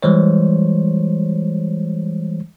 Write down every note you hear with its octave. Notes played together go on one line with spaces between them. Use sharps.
E3 G3 G#3 C5 C#5